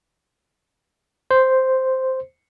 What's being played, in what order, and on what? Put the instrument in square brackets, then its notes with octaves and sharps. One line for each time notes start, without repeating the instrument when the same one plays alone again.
[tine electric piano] C5